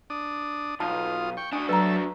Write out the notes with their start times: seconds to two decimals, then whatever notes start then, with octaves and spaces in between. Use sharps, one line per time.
0.10 D4 D#6
0.80 B1 F4 F5 A5 D#6
1.37 G5 C#6
1.53 D4 F#4 G#5 D#6
1.69 F#3 A4 B4 E5 A#5